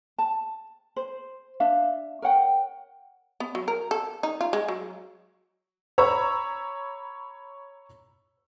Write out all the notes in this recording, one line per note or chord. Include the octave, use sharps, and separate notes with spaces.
A5
C5
D4 E5 F5
A#4 C#5 F#5 G5
B3
F#3
A#4
A4
D#4
F4
G#3
F#3
C#5 A#5 B5 E6